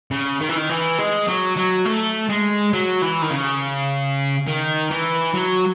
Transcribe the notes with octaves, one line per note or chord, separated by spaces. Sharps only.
C#3
D#3
E3
D#3
E3
G#3
F#3
F#3
A3
G#3
F#3
E3
D#3
C#3
D#3
E3
F#3